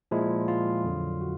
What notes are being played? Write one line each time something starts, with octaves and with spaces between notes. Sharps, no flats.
A#2 F3 G#3 E4
F4
F2 D3 F#3
F#4